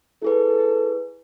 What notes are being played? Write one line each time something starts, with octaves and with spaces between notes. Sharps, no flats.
E4 G#4 A4 B4